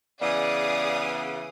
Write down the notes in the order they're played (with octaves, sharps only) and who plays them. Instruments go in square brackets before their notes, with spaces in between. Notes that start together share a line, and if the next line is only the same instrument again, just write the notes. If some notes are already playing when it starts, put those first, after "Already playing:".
[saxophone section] C#3 E3 B3 [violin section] G#4 F5 D#6 [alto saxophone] D5